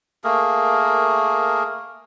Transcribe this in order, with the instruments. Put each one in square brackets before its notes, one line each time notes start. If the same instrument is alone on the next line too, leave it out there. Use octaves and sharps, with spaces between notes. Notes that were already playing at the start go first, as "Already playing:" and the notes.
[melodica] A3 A#3 G#4 A#4